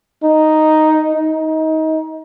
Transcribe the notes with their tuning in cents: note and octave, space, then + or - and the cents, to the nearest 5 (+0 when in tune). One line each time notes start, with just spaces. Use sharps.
D#4 +0
D#4 +25